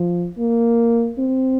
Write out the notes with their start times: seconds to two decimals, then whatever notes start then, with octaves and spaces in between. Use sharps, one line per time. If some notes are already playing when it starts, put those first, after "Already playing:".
Already playing: F3
0.38 A#3
1.19 C4